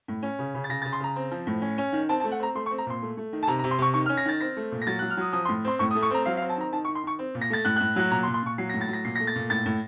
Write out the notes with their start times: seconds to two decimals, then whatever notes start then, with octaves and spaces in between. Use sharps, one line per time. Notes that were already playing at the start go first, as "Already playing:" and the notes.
0.08 A2
0.23 C#4
0.39 C#3
0.55 C#3
0.64 A6
0.69 C#3 A#6
0.82 A6
0.85 C#3
0.93 C6
1.00 C#3 A#5
1.16 C4
1.31 F3
1.47 A2
1.62 C#4
1.78 C#4
1.93 D#3
2.09 C4 A5
2.20 A5
2.24 A3
2.31 F#5
2.40 C4 A#5
2.55 A3 C6
2.66 C#6
2.71 C4
2.78 A#5
2.86 A#2 C6
3.02 A3
3.17 A3
3.33 D#3
3.43 A5
3.47 C3 A#5
3.59 A#5
3.64 C3
3.71 C6
3.79 C3 C#6
3.94 D#3 C#6
4.06 F6
4.09 C#4
4.17 A#6
4.25 D#3 A6
4.40 C4 A#6
4.57 A3
4.72 A#2
4.82 A#6
4.87 F#3 A6
4.99 F#6
5.02 F#3
5.10 F6
5.17 F#3 D#6
5.33 F3 D#6
5.45 C6
5.49 A2
5.65 C4 C6
5.79 A2 C#6
5.91 D#6
5.95 A3
6.02 C#6
6.11 C4 A#5
6.25 F#3 F5
6.37 F5
6.42 C4
6.49 A5
6.57 D#3 A#5
6.73 D#3 A5
6.85 C#6
6.88 D#3
6.95 C6
7.04 D#3 C#6
7.19 C4
7.35 A#2
7.41 A#6
7.50 A3 A6
7.65 A2 F#6
7.76 F#6
7.81 A2
7.96 F#3 F#6
8.11 A#2 A#5
8.23 C6
8.27 A#2
8.34 C6
8.43 A#2 C#6
8.58 F#3 C7
8.70 A#6
8.74 A2
8.81 A6
8.88 F#3 A#6
9.05 A#2 C7
9.16 A#6
9.20 A3
9.27 A6
9.36 A#2
9.50 A2 A6
9.66 A2